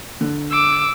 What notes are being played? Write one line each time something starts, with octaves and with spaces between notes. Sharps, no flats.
D3
D6 E6